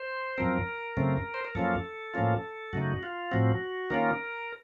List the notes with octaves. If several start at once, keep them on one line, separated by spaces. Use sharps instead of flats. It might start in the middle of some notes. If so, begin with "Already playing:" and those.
Already playing: C5
F#2 F3 C4 A#4
F#2 C#3 A3 C4
C5
A#4
F#2 F3 A#3 C#4 F4 A4
A2 F3 A#3 C#4 F4
F#2 C#3 A3 D#4 F#4
F4
A2 F3 C4 F#4
D#3 A#3 C#4 F4 A#4